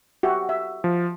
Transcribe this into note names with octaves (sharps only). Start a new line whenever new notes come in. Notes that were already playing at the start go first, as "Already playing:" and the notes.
F#4 G4 E5
E5
F3